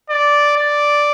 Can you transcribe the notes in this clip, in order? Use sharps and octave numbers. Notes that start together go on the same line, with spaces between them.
D5
D5